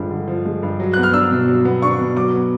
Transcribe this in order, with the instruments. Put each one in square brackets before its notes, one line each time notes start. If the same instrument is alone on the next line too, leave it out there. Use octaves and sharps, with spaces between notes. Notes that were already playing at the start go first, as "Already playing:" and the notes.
Already playing: [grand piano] G2 D3 F3 G#3
D3
F3
G#3
G2
F#3
B3 F#6
F6
D4 E6
B2
F#3
B3
D4 C#6
B2
F#3 D6
B3